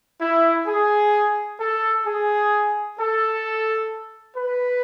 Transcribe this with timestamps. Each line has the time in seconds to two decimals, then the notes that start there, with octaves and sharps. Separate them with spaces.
0.21 E4
0.67 G#4
1.60 A4
2.06 G#4
2.99 A4
4.37 B4